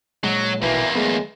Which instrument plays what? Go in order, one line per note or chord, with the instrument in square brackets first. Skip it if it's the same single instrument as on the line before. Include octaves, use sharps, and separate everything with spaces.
[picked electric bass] A#2 G#3 [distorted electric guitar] F#3
[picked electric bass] A#1 B2 [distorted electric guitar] E2 A#3 [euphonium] E3
[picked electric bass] F#3 A3 B3 [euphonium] G#3